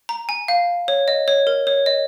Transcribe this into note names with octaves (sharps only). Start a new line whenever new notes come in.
A#5
G#5
F5
C#5
D#5
C#5
A#4
C#5
D#5